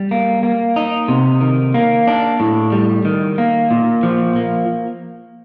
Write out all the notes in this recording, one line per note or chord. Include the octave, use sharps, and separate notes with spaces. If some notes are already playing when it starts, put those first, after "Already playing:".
Already playing: G3
A#3
A#3
D#4
C3
D#3
A#3
D4
A2
G3
D#3
A#3
A#2
F3
A#3